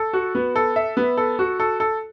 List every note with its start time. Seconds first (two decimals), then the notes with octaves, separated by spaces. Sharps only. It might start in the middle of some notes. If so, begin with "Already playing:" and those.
Already playing: A4
0.13 F#4
0.35 B3
0.56 A4
0.76 E5
0.97 B3
1.17 A4
1.39 F#4
1.60 A4
1.80 A4